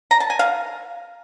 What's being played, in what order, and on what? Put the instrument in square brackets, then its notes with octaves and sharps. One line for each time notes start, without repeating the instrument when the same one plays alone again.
[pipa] A#5
A5
G#5
F5